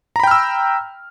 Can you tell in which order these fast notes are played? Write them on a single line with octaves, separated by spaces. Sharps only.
A#5 B5 G5 F6 E6